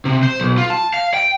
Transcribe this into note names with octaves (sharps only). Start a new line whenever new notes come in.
C3
C5
B1
F4
A5
F5
G5